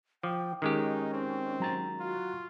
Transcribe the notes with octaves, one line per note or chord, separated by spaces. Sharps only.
F3 G5 D6
D#3 G#3 C#4 D#4 G4
C4
F#3 A#5 A6
F4 F#4